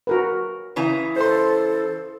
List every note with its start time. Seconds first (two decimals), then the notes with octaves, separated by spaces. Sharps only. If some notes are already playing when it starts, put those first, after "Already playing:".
0.07 F#4 A#4 B4
0.76 C#3 E3 A#5
1.16 A4 C5 C6